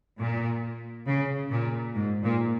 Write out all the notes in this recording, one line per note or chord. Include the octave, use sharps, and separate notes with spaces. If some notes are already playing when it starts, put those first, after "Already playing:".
A#2
C#3
A#2
G#2
A#2